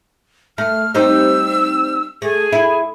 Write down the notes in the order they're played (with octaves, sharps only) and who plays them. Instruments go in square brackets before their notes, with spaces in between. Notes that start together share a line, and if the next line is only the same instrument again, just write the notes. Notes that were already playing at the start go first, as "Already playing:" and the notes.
[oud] A3 [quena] F6
[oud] G3 C4 D#4 [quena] E6
[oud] A3 [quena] G#4
[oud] E4